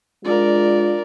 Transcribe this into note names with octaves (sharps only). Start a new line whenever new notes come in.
G#3 D4 F4 A#4 D5